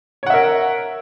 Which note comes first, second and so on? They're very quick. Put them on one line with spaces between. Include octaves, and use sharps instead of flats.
C#5 F#5 E5 A#4